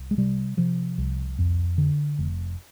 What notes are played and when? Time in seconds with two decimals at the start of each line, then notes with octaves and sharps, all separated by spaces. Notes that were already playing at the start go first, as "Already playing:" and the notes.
Already playing: C2
0.11 G#3
0.17 C3 G3
0.57 C3 F3
0.98 C2
1.39 F2
1.78 D3
2.19 F1